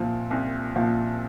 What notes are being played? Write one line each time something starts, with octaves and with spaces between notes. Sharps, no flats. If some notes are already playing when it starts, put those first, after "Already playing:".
Already playing: C2 A#2 F3
C2
A#2 F3